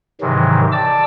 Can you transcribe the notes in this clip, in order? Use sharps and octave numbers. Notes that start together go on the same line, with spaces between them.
G#2 C3 D#3 E3 F#3
D5 A5 D6 E6